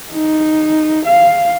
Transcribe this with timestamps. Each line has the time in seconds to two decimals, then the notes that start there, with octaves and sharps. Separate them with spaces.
0.11 D#4
1.06 F5